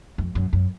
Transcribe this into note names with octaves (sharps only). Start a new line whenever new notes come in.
F2
F#2
F#2